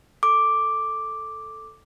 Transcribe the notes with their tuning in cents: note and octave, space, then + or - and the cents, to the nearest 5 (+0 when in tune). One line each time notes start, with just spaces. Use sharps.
A4 +0 D6 +0